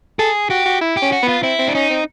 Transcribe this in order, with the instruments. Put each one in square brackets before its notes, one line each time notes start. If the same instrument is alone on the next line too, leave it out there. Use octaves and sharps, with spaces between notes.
[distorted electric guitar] G#4 [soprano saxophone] A4
[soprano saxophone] F#4 [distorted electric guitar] G4
[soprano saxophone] F#4
E4
[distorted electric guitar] G4
[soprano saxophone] C#4
[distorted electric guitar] F#4
[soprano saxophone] B3
[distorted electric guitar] F4
[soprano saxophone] C4 [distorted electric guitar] E4
[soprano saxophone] C4
[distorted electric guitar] D4
[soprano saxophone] C#4 [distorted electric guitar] D#4
[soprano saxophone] C4